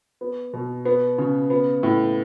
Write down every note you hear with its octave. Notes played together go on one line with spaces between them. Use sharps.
B3
B2
B3
C#3
B3
A2